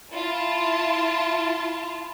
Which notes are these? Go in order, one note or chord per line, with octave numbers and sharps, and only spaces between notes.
E4 F4 A5